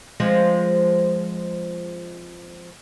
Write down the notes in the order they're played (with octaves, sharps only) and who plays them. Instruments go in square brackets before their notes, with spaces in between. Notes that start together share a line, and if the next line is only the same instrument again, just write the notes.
[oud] F3 G#3 C4